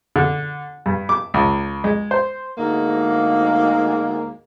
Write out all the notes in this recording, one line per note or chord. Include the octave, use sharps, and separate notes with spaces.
D3
G2
D6
C#2
G#3
C5
D2 G#2 G#3 A#3